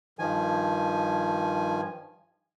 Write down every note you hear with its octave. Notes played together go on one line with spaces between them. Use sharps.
G2 D#3 F3 G#5